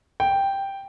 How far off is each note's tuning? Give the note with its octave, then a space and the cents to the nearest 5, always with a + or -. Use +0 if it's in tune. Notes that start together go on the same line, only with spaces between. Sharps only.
G5 +0